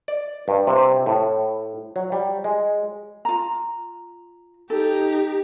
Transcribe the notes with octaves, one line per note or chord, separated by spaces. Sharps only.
D5
G2
C3
A2
F#3
G3
G#3
F4 A#5
D#4 G4 A4